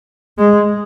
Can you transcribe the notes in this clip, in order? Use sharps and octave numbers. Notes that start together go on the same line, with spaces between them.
G#3